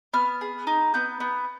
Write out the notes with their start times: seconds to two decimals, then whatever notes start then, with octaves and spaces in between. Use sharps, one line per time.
0.13 B3 F6
0.41 G#4
0.67 D#4
0.94 B3 G6
1.20 B3